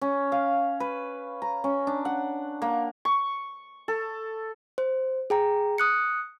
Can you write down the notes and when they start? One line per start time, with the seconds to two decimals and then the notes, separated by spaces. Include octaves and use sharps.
0.02 C#4
0.32 F5
0.80 B4
1.42 A#5
1.64 C#4
1.87 D4
2.05 F#5
2.62 A#3
3.05 C#6
3.88 A4
4.78 C5
5.30 G#4 G5 A#5
5.78 D#6 F#6 C#7